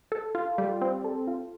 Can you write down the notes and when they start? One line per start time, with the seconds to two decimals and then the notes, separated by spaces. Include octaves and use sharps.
0.12 A4
0.35 F4
0.58 G3
0.81 C4
1.04 A4
1.28 F4